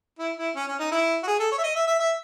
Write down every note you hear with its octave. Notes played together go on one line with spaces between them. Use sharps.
E4
E4
C#4
C#4
D#4
E4
F#4
G#4
A4
C#5
E5
D#5
E5
E5
E5